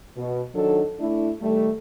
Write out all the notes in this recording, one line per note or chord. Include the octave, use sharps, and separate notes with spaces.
B2
D#3 F#3 D4 D#4 A4
A3 D4 E4
D#3 G3 A3